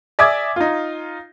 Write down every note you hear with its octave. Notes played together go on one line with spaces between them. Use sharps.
D5 E5 G#5 D6 D#6 G#6
D#4 F4